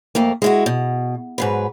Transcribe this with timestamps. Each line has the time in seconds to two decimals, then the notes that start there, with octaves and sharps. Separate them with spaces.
0.15 F2 A3 A#3
0.42 G#3 E4 F#4
0.66 B2
1.38 G#2 F#3 B4